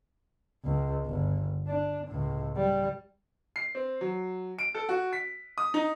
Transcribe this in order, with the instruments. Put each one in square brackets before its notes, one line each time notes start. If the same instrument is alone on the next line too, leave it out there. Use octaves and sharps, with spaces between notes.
[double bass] C#2
G1
D4
C#2 A2
G3
[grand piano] C7
C4
F#3
D7
A4
F#4
B6
D#6
D#4